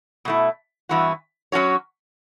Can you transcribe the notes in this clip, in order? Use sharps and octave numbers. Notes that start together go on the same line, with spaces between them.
B2 A3 E4
G2 E3 B3 F#4
F#3 C#4 F#4 C#5